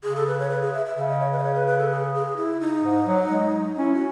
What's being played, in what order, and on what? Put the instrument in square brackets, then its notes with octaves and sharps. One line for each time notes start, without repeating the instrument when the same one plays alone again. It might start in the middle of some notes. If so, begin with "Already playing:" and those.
[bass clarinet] C#3 [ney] G#4
[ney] A4
B4
C#5
B4
G#4
E5
E5
[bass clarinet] C#3 [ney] E5
[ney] D#5
C#5
B4
D#5
C#5
B4
B4
A4
G#4
G#4
E4
D#4
[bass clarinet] G#2
F#3
G#3
[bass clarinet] C#4 [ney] E4
[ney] F#4